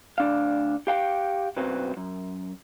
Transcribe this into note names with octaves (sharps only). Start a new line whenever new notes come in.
D2 D4 F5
G4 F5 G5
B1 F#2 F#3 C4 B4
F#2